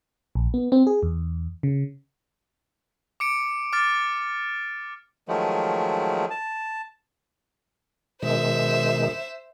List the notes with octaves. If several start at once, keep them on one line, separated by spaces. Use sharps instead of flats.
A#1
B3
C4
G#4
E2
C#3
D6 C#7 D7
D6 F6 A6
D#3 F3 F#3 G#3 A3
A5
B2 D#3 G#3 C5 E5